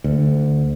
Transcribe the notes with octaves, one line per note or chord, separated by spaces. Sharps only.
D2